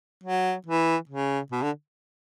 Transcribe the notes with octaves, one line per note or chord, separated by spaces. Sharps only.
F#3
E3
C#3
B2
D3